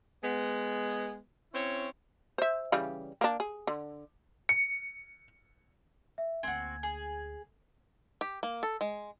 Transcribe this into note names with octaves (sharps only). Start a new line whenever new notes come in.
G#3 B3
C4 C#4 E4 C#5
C5 E5
C#3 E3 G3
A#3 D4
G#4
D3
C#7
E5
D2 A#3 C4 F#4 G#5 G#6
G#4
G4
A#3
A4
G#3